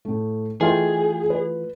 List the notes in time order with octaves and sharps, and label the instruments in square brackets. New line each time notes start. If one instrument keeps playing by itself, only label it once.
[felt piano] A2 A3
[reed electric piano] E3 A3 F4 [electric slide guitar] G#4 [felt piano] D#5 F5 G5
[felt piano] B4